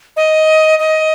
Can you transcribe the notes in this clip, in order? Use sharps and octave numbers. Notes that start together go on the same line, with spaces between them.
D#5
D#5